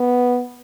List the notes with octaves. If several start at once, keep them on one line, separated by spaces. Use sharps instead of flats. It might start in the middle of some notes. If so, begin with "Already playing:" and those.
Already playing: B3